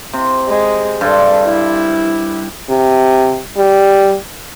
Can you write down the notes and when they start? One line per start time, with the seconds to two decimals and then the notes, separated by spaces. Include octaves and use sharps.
0.14 C3
0.48 G#3
1.01 G2 A4 C6
1.45 E4
2.70 C3
3.57 G3